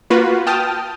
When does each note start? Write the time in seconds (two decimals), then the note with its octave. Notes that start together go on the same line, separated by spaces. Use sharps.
0.10 A#3 F4 F#4 B4
0.47 G5 A5 D#6 F6